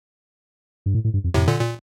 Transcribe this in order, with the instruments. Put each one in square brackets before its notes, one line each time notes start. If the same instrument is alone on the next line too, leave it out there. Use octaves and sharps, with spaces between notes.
[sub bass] G2
A2
A2
G2
F2
[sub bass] F2 [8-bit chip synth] A2 C3
[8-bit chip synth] A#2 D3
A#2